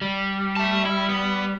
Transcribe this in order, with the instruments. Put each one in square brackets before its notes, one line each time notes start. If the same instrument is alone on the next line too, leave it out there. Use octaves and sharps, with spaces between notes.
[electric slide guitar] G3
[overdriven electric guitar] E5 A5
E4
B3